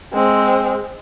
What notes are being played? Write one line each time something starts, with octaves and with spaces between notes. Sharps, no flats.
G#3 C4